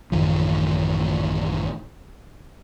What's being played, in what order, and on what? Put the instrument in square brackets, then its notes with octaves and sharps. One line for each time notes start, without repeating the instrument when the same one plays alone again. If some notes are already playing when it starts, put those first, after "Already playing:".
[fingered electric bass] A1 F#2 D#3 F3